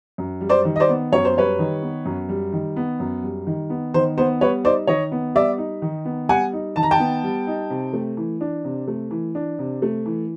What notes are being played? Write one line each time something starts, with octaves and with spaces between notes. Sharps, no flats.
F#2
G3
C5 D5
D#3
D#5
C5 D5
B3
F#2 C#5
C5
G3 B4 C#5
D#3
B3
F#2
G3
D#3
B3
F#2
G3
D#3
B3
D#3 C5
B3 C5
G3 B4 C#5
D#4 C5 D5
D#3 C#5 D#5
B3
G3 D5 E5
D#4
D#3
B3
G3 F#5 G#5
D#4
D#3 A5
A#5
G5 A5
B3
G3
D#4
C3
A3
E3
D4
C3
A3
E3
D4
C3
A3
E3